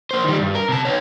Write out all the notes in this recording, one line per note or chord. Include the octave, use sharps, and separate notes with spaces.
A#3 C5
D#3 G3
G2
A#4
C3 A5
B3 C#5